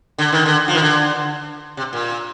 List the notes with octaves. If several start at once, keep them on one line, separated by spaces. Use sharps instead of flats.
D3
D#3
D3
F3
D#3
D3
C3
A#2